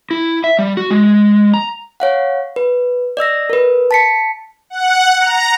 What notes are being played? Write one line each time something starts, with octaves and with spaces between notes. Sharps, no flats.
E4
E5
G3
F#4
G#3
A#5
C#5 F5 F#5
B4
D5 D#5 E6 A#6
A#4 B4
A5 B6 C#7
F#5
A#5